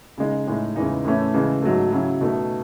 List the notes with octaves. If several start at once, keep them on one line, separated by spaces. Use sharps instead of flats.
C#3 G#3 D#4
A2 G#3 D#4
E2 C#3 E3 G#3 D#4
A2 E3 A3 C#4 E4
C#3 E3 G#3
G#2 F#3 A3
C#3 F#3 C#4 E4
B2 A3 D#4